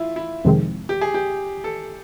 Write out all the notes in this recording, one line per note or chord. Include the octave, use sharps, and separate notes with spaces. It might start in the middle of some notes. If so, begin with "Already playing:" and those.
Already playing: E4 F4
E4
F2 C3 D#3 G#3 C4
G4
G#4
G4
A4